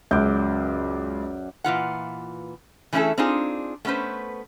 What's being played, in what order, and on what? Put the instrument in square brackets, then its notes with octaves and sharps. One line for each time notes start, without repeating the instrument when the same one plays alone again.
[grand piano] C#2 G6 [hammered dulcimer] F#2 D5
[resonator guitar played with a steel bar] A#2 E3 F4 F#5
E3 A3 C#4 E4 G#4 A4
C4 D4 D#4 F4 G#4
A3 B3 C#4 B4 C5